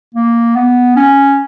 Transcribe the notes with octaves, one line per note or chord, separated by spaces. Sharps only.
A#3
B3
C#4